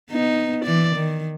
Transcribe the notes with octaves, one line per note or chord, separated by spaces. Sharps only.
B3 D#4
E3 D5
D#3